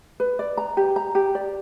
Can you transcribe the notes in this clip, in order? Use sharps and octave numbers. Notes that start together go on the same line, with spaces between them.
B4
D5
A#5
G4
A#5
G4
D5